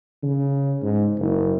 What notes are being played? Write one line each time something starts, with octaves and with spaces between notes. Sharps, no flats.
C#3
G#2
F#1